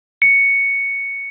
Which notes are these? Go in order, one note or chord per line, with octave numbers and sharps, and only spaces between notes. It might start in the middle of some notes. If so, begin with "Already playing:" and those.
C#7